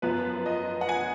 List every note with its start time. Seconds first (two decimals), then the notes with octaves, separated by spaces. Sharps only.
0.02 F#2 F3 B3 B4
0.46 D#5
0.81 F#5
0.89 G#5